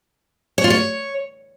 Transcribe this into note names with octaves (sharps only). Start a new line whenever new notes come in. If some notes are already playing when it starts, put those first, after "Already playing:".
C#5
F4
C#5